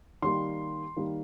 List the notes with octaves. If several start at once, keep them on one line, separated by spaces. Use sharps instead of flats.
D#3 G3 A#3 C6
D#3 G3 A#3